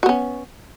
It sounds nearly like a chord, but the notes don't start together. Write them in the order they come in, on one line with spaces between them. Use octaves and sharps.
F#4 B3 C#4